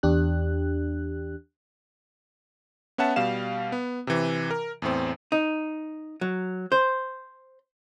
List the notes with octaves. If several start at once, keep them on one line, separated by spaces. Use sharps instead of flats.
E2 D4 G4 F#6
B3 C#4 E5 F#5 A5
B2 G3 F5 E7
B3
C3 E3
A#4
E2 A2 C4
D#4
F#3
C5